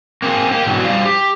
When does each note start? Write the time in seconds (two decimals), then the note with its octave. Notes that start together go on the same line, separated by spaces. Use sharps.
0.22 A#3 C4 F4 G#4
0.52 A#3 G4
0.66 G#2 B2 E3 F#3
0.84 G3 C5 D5 F5
1.05 G4